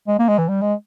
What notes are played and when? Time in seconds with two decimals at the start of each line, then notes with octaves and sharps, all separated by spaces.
0.08 G#3
0.19 A#3
0.28 G#3
0.38 E3
0.48 G3
0.61 G#3